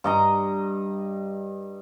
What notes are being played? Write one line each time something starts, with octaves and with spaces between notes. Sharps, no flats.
G2 D#5 A#5